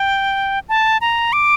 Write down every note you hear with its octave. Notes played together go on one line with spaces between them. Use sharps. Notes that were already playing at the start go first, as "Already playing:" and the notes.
Already playing: G5
A5
A#5
D6